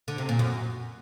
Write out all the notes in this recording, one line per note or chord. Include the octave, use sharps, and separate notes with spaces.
D3
C3
A#2
F#2